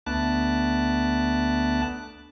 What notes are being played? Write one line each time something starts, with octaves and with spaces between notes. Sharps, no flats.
D2 A3 B3 D4 A5 F#6